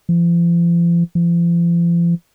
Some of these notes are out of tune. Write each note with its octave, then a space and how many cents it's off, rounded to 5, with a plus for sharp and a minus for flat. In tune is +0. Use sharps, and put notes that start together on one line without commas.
F3 -40
F3 -40